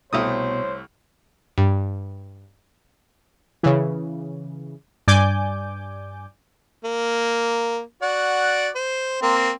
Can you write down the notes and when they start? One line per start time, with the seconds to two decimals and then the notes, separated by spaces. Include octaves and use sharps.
0.13 C2 B2 A3 C5 C#5 D#6
1.58 G2
3.63 C#3 E3
5.08 G2 D5 G#5 D6 G6
6.84 A#3
8.02 F#4 D5 F#5
8.75 C5
9.22 A#3 C4